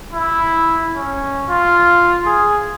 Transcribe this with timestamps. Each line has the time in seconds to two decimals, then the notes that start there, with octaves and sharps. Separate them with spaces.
0.13 E4
0.95 C#4
1.50 F4
2.26 G#4